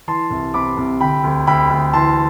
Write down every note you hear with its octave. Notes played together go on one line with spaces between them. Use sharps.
E3 A5 C6
C2
C3 B5 D6
C2
D3 G5 B5
D2
D2 G5 B5
D2
E3 A5 C6